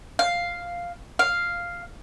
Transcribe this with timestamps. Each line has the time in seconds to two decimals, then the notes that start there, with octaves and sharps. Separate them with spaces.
0.19 F5
1.19 F5